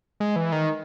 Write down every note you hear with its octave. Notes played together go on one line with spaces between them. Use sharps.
G#3
E3
D#3